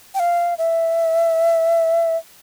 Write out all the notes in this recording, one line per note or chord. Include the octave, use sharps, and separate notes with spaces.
G5
F5
E5